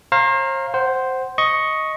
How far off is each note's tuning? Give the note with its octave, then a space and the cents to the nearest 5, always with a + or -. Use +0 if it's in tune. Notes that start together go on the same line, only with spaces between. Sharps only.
C5 +45 F5 +0 A#5 +0
C5 +0 F#5 +20
D#5 +10 C#6 +0